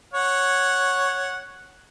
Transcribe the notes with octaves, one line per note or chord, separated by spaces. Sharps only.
C#5 F#5